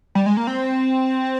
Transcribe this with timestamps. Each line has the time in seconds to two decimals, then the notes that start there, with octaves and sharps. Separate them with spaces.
0.15 G3
0.26 G#3
0.37 A#3
0.47 C4